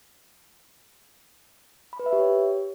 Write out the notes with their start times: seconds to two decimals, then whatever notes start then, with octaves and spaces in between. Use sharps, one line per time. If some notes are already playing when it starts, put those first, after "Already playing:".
1.93 B5
1.99 B4
2.06 E5
2.13 G4
2.19 C#5